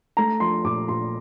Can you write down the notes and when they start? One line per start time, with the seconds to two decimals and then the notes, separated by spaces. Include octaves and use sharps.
0.17 A3 A#5
0.40 F3 C6
0.64 A#2 D6
0.88 A#2 C6